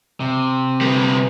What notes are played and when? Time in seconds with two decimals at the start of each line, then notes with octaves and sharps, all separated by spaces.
0.20 C3
0.81 G3 B3